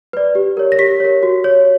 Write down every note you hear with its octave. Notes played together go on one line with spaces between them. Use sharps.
B4 D5
G4
A#4 C#5
A#6
G4 B6
A#4 C#5
F#4
C#5